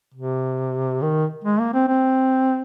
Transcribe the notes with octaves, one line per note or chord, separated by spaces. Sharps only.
C3
D#3
G#3
A#3
C4
C4